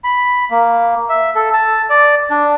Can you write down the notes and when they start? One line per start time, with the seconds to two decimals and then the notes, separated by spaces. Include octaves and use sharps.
0.04 B5
0.51 A#3
1.09 E5
1.35 A4
1.54 A5
1.90 D5
2.30 D4